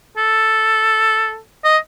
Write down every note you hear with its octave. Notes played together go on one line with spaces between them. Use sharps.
A4
D#5